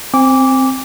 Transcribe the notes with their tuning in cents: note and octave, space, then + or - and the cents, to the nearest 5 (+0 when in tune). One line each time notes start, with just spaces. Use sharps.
C4 +0 G#5 -35 D6 -15